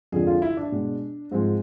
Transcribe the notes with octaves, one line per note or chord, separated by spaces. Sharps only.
F2 D3 F3 G#3 G#4
F4
E4
D4
B2 G#3
G#2 F3 G#3 C4